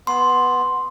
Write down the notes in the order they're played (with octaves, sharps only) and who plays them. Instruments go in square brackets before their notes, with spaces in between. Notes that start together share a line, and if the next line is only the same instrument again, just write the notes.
[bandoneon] B3 [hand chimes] C6